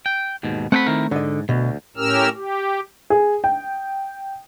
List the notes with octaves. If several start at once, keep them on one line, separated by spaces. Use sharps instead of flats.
G5
D#2 G#2 B2
A3 C4 F#5 G5 B5
D#3 E4 A#4
G#2 D3 D#5
D2 B2
A2 C#4 G4 A#4 E6 F6
G4
G#4
G5